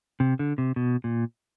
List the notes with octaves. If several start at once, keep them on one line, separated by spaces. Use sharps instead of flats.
C3
D3
C3
B2
A#2